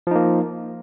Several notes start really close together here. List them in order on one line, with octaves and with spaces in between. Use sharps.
F3 D#4 A#3